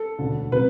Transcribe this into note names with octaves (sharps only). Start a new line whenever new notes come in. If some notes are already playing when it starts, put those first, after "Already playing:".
Already playing: A4
E1 D2 D3
C3 F#3 B4